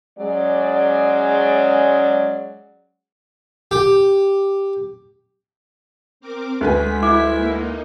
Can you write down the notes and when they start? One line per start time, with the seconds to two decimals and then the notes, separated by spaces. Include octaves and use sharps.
0.18 F#3 G#3 C#4 G#4 D5
3.71 G4
6.20 C4 A#4 D6
6.61 D2 G#3 B4 G#5 B6
7.03 E4 D6
7.36 A#3 D#4